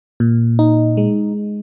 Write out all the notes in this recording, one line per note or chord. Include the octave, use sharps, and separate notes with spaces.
A#2
D#4
G#3